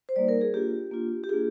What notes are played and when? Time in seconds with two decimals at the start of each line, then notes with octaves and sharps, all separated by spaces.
0.09 C5
0.16 G3 A#3 D#4 D5
0.28 A#4
0.41 G#4
0.54 A#3 D4 F4 G4
0.91 A#3 D4 F4
1.24 G4
1.29 A#3 D4 F4 G#4